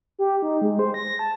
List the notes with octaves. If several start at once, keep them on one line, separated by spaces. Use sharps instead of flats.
G4
D#4
G#3
C5
A#6
A5